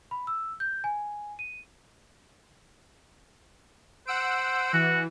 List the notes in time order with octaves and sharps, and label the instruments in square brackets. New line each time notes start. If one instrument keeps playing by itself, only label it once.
[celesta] B5
E6
G6
G#5
D#7
[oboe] C5 [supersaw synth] F#5 E6 D7
[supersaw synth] E3 [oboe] F#4